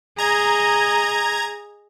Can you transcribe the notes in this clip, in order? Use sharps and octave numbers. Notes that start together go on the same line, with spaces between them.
G#4 D#5 A#5 G#6